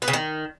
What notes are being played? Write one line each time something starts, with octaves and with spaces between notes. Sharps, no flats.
B3
C#3
D#3